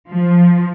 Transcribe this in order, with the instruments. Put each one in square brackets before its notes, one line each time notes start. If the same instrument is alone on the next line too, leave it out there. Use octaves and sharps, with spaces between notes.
[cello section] F3